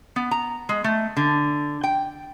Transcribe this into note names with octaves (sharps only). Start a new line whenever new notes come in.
B3
A#5
G#3
A3
D3
G5